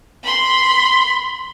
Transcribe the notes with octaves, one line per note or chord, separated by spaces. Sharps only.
B5 C6